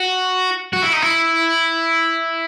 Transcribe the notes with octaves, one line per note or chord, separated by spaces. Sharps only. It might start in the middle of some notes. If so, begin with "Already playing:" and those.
Already playing: F#4
F#4
E4
D#4
E4